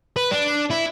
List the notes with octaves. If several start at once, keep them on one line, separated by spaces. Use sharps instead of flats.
B4
D4
E4